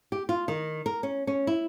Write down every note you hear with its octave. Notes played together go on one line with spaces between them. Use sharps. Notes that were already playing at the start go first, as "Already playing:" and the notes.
G4
F4
D#3
A#4
C#4
C#4
E4